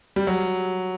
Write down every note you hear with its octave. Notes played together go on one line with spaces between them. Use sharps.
G3
F#3